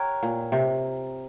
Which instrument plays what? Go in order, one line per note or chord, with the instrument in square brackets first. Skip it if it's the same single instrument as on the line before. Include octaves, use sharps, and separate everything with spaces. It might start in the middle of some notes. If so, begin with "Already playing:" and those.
Already playing: [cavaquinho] G4 A#4 C#5 F#5
[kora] A#2
C3